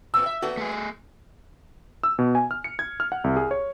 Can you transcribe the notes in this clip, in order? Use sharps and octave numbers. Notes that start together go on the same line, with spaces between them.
F2 A#2 E6
E5
A#3 F#4 A4 D5
A3 G#4
E6
B2
G#5
F6
C#7
G#6
F6
F#5
C2
G#4
C#5